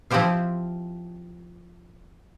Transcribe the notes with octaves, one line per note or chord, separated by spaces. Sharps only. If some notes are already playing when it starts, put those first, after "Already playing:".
F3 C4 E4 G4 C5 F5